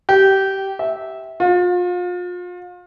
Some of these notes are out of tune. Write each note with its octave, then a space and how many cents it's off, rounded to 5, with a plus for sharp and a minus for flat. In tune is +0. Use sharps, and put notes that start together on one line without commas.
G4 -20
E5 -15
F4 +35